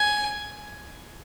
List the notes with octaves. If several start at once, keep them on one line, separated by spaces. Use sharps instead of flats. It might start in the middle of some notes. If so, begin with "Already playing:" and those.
Already playing: G#5